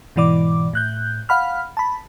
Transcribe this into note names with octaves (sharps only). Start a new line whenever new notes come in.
G#2 B2 E3 D5 D6
A2 F#6 G6
F5 F#5 B5 F6
A5 B5